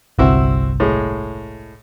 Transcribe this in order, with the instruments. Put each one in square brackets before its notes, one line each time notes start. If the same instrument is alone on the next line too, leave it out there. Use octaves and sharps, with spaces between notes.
[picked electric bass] G1 C2 [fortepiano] C4 E4 F#4
[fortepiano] A2 G#3